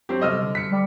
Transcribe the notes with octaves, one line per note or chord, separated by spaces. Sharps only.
F#3 C4 G4
C3 G3 A4 D#5 E6 F6
D3
B6 C#7
G3